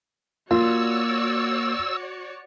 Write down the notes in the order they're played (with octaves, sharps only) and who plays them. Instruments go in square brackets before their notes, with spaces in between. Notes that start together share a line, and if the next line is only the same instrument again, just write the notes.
[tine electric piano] A#3 [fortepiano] F4 [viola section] F#4 C#5 D5 [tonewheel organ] E6